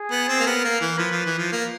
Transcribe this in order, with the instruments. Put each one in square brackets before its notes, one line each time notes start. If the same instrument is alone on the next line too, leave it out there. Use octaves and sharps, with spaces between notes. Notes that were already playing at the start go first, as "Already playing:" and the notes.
Already playing: [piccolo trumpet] G#4
[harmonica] B3
C4
A#3
[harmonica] B3 [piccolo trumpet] A#4
[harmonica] A#3
E3
[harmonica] F3 [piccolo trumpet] B4
[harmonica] F3
E3
F3
A#3